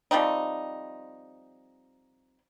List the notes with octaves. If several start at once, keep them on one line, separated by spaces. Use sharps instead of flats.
F3 G3 C4 D#4